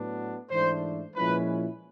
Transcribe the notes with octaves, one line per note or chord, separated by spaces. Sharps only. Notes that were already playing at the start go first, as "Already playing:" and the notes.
Already playing: A2 F#3 B3 D4
G#2 E3 A3 D4 C5
A#2 F3 G#3 C#4 E4 B4